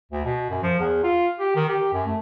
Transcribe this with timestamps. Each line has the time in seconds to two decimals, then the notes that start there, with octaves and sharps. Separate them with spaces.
0.11 D2
0.25 B2
0.50 F#2
0.62 F3
0.79 E2
1.03 F4
1.39 G4
1.55 D#3
1.69 G4
1.93 F#2
2.06 A3